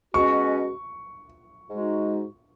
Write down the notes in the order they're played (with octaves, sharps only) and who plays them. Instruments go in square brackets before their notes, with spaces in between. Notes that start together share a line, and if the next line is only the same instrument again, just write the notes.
[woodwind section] B2 G#3 C#4 F#4 [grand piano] C#6
[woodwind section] G#2 G#3 D#4 F#4